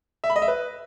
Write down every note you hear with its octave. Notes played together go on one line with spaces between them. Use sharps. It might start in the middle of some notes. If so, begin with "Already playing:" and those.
E5
B5
D#5
E5
B4